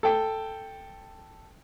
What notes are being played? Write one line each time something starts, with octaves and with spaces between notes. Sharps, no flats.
A4 G5